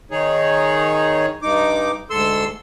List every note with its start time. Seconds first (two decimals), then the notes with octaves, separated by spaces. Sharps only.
0.11 D#3 D#4 G#4 C#5
1.42 G2 D#4 D6
2.10 D2 G#2 A4 C6 E6